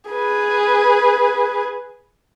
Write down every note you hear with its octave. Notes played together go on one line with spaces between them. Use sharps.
G#4 B4